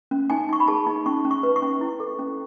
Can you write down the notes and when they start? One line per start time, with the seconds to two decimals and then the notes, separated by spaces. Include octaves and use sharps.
0.11 C#4
0.30 D#4 G#5
0.49 D#4 C#6
0.60 B5
0.68 G#4 A5
0.87 D#4
1.06 C#4 C#6
1.25 C#4
1.31 C#6
1.43 B4
1.56 C#6
1.62 C#4
1.81 E4
2.00 A4
2.19 C#4